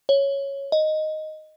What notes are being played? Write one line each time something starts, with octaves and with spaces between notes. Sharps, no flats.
C#5
D#5